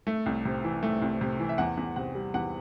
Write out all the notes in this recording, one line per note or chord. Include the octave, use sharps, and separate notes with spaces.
A3
C2
C3
E3
A3
C2
C3
E3
E5
E2 F#5
E2
C3 F#5
G3
E2 F#5